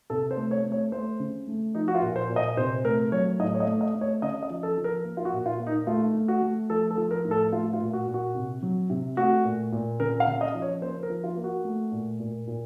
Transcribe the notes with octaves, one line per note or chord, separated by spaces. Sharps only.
C3 A4
C5
A3
C#5
A3
C#5
A3 C5
C#3
A3
F3 D#4
F#4
F4
A#2
C5
A#2
D#5
C3 C5
A3 A#4
F#3 C#5
A2 D#5
C#5
D#5
A3
D#5
A3
C#5
C#3 D#5
D#5
F3
A4
F3
A#4
A#3
F4
F#4
A#2
F4
A#3
D#4
A3 F4
A3
F#4
A3
F3 A4
A4
F3
A#4
A2
A4
A3 F4
F4
A#2
F#4
A#2
F#4
C3
F#3
C3
A3 F#4
A#2
A#2
C#3 A#4
F5
C#3
D#5
F3
C#5
A#3 C5
A#4
F3
F4
A#3
F#4
A3
A#2
A#2
A#2